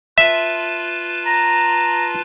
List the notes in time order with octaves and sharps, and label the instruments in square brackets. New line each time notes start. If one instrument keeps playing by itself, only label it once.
[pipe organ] F4 B4 A5 [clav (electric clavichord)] E5
[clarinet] A#5